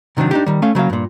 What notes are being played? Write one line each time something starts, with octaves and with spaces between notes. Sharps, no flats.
C3 D#3 F3 F#3 D4
D4 D#4 G4
D#3 G3
A3 C#4 F5
C#3 F#3 A#3 F5
G2 A#2